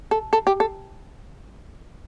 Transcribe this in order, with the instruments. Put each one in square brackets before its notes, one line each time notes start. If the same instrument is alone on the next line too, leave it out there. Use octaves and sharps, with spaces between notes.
[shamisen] A4
A4
G4
A4